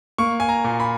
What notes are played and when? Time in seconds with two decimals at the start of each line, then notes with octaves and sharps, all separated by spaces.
0.18 A#3 C#6
0.40 G#5
0.49 A#5
0.64 A#2
0.80 B5